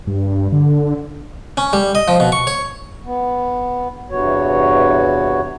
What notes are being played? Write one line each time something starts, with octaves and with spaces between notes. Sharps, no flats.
G2
D3
C#4
G3
D#5
F3
B2
C#6
C#5
B3
E2 G2 C3 B3 F#4 C#5